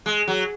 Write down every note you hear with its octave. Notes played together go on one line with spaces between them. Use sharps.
G#3
F#3